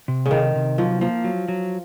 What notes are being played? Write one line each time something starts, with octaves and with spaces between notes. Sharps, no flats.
C3
C#3
C3 D#3
C3
F3 F#3
F3 A#3
F#3
F#3